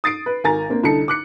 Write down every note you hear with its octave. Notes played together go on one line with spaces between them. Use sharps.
D#6 A6 C7 D7
B4
G#1 A#4 G#5 A#5 A6
A#3 C4 D4
C2 D3 D#4 A5 C#7
D6 F#6 C#7